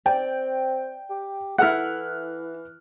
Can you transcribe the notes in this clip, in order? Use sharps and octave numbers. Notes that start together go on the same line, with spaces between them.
C4 D5 G5
G4
E3 E4 A4 F#5 F6 F#6